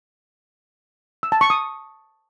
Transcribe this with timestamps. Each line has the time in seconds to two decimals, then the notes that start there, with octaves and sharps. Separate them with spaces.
1.23 E6
1.32 A5
1.41 C#6
1.50 D#6